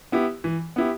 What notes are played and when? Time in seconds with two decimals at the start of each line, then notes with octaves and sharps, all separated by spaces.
0.12 B3 E4 G4
0.44 E3
0.76 B3 E4 G4